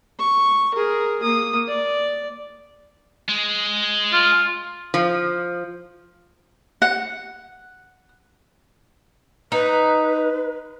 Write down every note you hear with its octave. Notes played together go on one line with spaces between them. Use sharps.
C#6
G#4 A#4
A#3 D#6
D5
G#3
F4
F3
F#5
D#4 B4